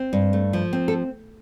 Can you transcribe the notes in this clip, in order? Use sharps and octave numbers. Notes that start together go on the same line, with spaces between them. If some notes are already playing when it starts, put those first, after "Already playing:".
Already playing: C4
G2
A3
F3
C4
A4